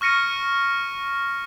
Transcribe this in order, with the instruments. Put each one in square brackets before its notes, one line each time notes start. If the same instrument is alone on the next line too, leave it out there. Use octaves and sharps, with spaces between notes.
[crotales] C#6 F6 A#6 C#7 D#7